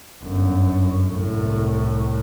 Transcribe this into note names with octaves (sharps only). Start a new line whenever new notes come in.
G1 F#2
C2 A2